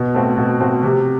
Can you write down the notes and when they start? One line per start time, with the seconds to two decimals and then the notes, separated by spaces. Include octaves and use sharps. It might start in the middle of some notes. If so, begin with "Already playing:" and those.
Already playing: B2
0.14 A3 C4 F#4
0.38 B2
0.60 A3 C4 F#4
0.83 C3